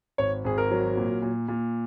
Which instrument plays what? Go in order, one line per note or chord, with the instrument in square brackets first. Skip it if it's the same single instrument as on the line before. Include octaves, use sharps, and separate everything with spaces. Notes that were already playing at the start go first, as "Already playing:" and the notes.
[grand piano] G#1 C#5
G#1 G#4
A#4
F#3
A#2
A#2
A#2